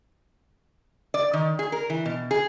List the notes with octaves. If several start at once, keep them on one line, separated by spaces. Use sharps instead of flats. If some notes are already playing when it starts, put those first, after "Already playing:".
D5
D#3
G#4
A#4
E3
B2
G#4